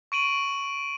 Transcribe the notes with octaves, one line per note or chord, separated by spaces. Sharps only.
C#6 D7 D#7 F#7